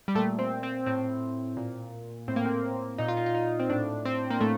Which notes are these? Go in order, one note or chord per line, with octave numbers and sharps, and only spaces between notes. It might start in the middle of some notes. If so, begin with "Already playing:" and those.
G3
A#2 A3
C4
C4
A2 C4
A#2
A2 C4
A#3
C4
A#2 D#4
F4
D#4
F4
D#4
C4
A2 D4
C4
A#3
A2 A3